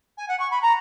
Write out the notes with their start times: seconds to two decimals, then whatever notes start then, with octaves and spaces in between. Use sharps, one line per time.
0.17 G#5
0.28 F#5
0.39 C#6
0.51 B5
0.62 A#5